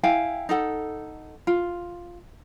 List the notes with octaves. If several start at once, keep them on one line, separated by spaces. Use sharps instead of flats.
E4 F5 G5 G#5
D#4 A4 F#5
F4